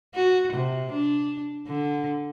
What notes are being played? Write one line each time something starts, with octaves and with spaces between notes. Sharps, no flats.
F#4
C3
D4
D3